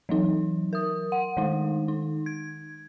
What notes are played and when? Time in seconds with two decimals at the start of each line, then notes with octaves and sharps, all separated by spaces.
0.09 E3 F#3 D#4
0.73 A#4 D#6
1.12 F#5
1.37 D#3 G#3 D#4
1.88 D#4
2.26 G#6